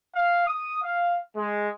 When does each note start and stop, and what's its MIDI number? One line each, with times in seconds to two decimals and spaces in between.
0.15 0.42 77
0.47 0.76 87
0.83 1.18 77
1.37 1.69 56